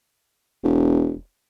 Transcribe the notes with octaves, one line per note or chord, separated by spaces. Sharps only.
E1